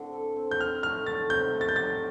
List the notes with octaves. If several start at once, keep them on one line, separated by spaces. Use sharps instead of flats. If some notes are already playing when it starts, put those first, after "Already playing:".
Already playing: A2 D3 C4
A4
C4
G6
C4 F6
A3 F6
A3 A6
C3 G6
A3
A6
G6
G4 A6